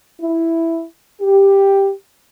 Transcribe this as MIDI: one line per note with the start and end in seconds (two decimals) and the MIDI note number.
0.21 0.84 64
1.21 1.90 67